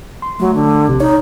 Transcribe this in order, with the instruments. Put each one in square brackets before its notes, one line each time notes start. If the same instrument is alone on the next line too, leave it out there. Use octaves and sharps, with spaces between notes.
[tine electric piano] C6
[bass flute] F#3 [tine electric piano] A3
[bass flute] D3
[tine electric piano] A#1 C3
[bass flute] D#4 [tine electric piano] C#5